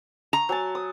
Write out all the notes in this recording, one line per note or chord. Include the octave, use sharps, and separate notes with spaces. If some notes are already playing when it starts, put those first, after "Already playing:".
A#5
F#3 G#5 A5
D#6